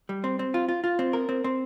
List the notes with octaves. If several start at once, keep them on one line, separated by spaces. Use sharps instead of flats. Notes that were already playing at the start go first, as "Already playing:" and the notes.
G3
C4
C4
F4
F4
F4
C4
A#4
C4
C4